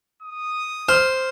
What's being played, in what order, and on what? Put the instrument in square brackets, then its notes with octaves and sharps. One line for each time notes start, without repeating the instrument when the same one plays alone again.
[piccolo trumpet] D#6
[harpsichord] C5 [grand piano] F6